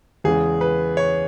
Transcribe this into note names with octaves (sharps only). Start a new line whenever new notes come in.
E2 C#3 E3 G#3 G#4
B4
C#5